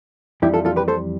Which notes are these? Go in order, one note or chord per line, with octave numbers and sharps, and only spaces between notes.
F2 E3 G3 E4 G4
F4 A4
F4 A4
G4 B4
A4 C5